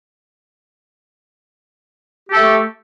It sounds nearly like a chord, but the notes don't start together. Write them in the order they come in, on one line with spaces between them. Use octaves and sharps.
G4 A4 A3